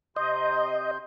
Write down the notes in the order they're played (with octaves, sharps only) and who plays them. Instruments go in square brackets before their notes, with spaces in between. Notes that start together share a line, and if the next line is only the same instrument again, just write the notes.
[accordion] C3 C6 G6 [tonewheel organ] D#5